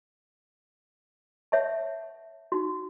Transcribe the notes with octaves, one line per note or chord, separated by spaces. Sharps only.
C#5 E5 F#5 A5
D#4 F#4